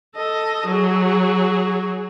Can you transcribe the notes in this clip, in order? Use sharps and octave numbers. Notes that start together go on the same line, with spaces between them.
A4 D#5
F#3 G#4